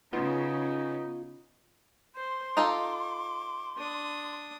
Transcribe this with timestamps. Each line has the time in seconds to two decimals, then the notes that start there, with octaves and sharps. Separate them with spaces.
0.13 C#3 B3 D#4 F4
2.16 C5 C6
2.57 D#4 F4 A4 D6
3.78 D4 D#6